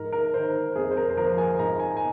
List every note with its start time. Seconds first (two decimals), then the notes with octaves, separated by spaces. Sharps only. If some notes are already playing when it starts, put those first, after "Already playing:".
Already playing: G#2 F3 A#4
0.12 A#4
0.34 D#3 C5
0.75 F2 G#4
0.91 C5
0.97 A#4
1.09 C5
1.17 F3 A#4
1.38 G#5
1.59 G#2 A#5
1.79 G#5
1.97 G#5